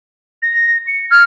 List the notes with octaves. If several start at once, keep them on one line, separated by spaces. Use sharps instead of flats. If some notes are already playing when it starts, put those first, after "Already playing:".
A#6
C#7
F6 G#6